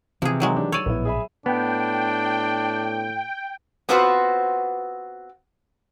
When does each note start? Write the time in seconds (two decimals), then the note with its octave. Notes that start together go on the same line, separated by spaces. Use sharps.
0.22 C3 E3 F3 G#4
0.40 D#3 F#3 G#3
0.56 D4 G4
0.72 C#5 D5 E6 D#7
0.86 A#1 A2 B3 E4
1.05 G#4 E5 B5
1.46 A2 B3 D4 G5
3.89 B3 C4 F4 F#4 B4 C5